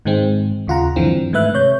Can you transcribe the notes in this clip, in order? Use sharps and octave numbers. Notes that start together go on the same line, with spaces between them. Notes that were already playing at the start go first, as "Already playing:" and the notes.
G#2 D#3 G#3 C4
D#2 C#3 F4 F#5 A#5
G2 D3 E3 F3 C4
G#2 D#3 A3 B4 E5 F#6
C3 C#5 G6